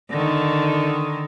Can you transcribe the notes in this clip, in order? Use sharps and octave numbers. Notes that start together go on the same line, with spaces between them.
D3 D#3